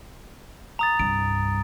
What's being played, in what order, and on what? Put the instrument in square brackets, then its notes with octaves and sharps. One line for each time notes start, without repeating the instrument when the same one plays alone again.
[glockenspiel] A#5 D#6 A6
[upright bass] C2 G2 [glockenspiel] D7